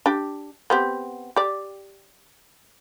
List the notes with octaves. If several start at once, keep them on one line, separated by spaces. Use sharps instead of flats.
D4 G4
B3 C4 G4
G4 D5